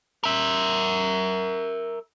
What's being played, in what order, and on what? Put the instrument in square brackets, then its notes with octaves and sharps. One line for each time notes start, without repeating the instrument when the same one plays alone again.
[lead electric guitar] A#4 E5